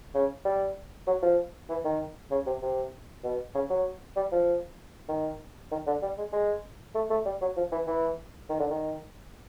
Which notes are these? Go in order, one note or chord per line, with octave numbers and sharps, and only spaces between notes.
C#3
G3
F#3
F3
E3
D#3
C#3
C3
C3
B2
C#3
F#3
G3
F3
D#3
D#3
D3
G3
G#3
G#3
A3
A3
G3
F#3
F3
E3
E3
D#3
D3
D#3